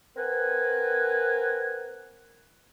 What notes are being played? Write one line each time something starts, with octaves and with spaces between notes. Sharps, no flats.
C4 A#4 B4 F#5 G#5